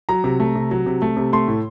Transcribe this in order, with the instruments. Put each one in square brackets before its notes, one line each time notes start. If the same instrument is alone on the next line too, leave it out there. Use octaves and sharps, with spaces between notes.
[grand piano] F#3 A#5
C3
A3
C3
F#3
C3
A3
C3
A3 C6
A2